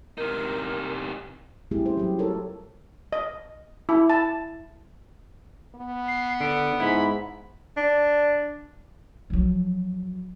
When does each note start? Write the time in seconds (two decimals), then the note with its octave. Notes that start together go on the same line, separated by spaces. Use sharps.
0.18 C3 D#4 A#4
1.71 G3 A3 C4 E4 G4 G#4
1.85 C#4 C5
1.97 F#3 G4
2.19 F4 A4 A#4 C#5
3.13 D#5
3.89 E4
4.10 A5
5.75 B3
6.08 C7
6.40 D3 D7
6.80 G#2 E4 B5
7.77 D4
9.30 F3 F#3